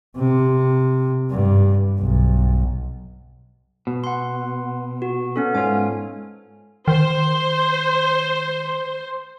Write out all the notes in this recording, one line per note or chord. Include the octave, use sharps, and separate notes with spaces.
C3
G2
B1
B2
F#5 C6
F#4
B3 C#4 A4
G#2 F4 A4 C#5 G#5
D#3 C5